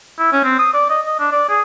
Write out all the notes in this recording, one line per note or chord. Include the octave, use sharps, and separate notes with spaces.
E4
C#4
C4
D#6
D5
D#5
D#5
D4
D5
G#4